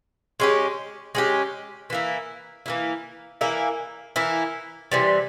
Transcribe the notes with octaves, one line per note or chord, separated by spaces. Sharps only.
G#3 C#4 G4
G#3 C#4 G4
E3 A#3 E4
E3 A#3 E4
E3 A#3 E4
E3 A#3 E4
C3 E3 G3